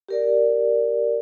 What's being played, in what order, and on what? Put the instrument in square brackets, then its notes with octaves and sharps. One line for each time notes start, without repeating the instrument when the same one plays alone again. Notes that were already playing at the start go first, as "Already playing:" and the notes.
[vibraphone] G4 A#4 D5